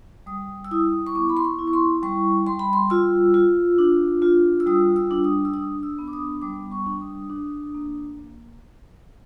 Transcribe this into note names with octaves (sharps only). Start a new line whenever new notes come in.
G3 D#6
E6
E4 D#6
C#6
B3 D6
B5
C6
C#6
E4
C#6
C6
G3 C#6
G3 C6
B5
C6
F4 E6
F4
D4
F4
E6
G3 D#6
E6
D4
D#6
E6
D4 D#6
E6
B3
D6
D#6
G3 D6
C#6
D4
D#6
D4
A#3